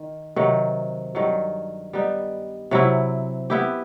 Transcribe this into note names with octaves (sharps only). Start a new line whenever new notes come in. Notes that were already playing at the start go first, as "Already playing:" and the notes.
Already playing: D#3
C3 D#3 F#3
G2 D#3 F#3
G3 B3 D#4
C3 F#3 C4 E4
B3 E4 G4